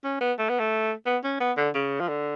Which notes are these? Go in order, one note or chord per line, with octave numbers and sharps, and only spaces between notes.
C#4
B3
A3
B3
A3
B3
C#4
B3
D3
C#3
F3
D3